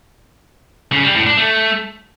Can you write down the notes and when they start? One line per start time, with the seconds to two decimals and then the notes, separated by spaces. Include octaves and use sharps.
0.92 C#3
1.04 G3
1.15 A2
1.26 D4
1.37 A3